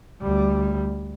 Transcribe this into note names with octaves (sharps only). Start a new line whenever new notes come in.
D2 G3